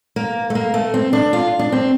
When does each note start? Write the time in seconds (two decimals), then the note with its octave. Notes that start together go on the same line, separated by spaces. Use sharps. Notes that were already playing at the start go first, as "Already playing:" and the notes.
0.16 A#3
0.50 A3
0.55 A#3
0.74 A3
0.94 C4
1.13 D4
1.33 F4
1.59 D4
1.72 C4